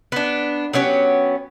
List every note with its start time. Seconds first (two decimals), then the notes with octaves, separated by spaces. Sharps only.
0.12 B3 D4
0.73 F#3 B3 C#4 G4